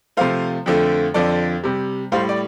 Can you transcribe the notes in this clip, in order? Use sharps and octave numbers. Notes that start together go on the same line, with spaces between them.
C3 F3 A3 C5 F5
F2 D3 F3 A3
F2 D3 F3 A4 D5
C3 G3
A2 G3 C5 F5
D5